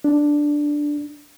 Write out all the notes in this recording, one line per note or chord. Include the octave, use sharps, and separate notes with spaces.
D4